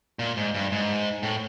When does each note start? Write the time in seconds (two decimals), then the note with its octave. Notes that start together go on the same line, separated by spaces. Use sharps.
0.19 A#2
0.37 G#2
0.55 G2
0.72 G#2
1.23 A2